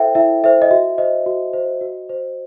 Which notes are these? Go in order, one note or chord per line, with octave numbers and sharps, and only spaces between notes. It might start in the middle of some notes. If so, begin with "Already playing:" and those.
Already playing: E4 A4 C5 E5 G5
E4 E5
A4 C5 E5
D#5
F#4 E5
C5 D#5
F#4
C5
F#4
C5